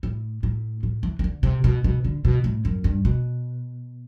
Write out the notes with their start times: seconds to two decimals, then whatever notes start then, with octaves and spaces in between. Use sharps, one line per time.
0.03 A2
0.43 A2
0.83 A2
1.03 E3
1.19 E3
1.24 D3
1.43 C3
1.64 B2
1.84 B2
2.04 D3
2.25 B2
2.44 A2
2.65 F#2
2.84 G2
3.05 B2